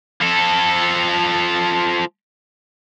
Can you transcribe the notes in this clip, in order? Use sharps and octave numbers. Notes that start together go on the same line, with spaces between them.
F3 A4